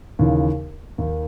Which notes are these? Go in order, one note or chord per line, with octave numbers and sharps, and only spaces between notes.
D#2 C#3 E3
D#2 D#3